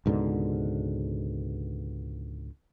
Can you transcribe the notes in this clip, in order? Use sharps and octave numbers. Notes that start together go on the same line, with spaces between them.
C#2 G#2 B2 D3